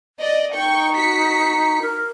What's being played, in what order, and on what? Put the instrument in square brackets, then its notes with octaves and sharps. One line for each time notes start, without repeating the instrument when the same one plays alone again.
[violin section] D5 D#5
[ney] D#4 [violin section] G5 C#6
[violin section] F#4 B6 C#7
[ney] A#4